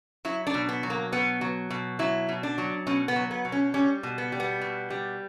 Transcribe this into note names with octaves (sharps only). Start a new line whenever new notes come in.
F#3 E4
D4
B2
B3
F#3
A#3
B2 B3
F#3
B2
F#3 E4
B2
D4
F#3
B2 C#4
B3
F#3
B3
B2
C#4
G3 C#4
B2
B3
G3
B3
B2
G3